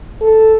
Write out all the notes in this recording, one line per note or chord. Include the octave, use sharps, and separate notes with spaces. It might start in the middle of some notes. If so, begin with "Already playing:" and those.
A4